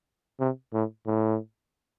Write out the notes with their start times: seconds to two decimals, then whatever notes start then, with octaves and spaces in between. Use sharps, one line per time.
0.40 C3
0.74 A2
1.07 A2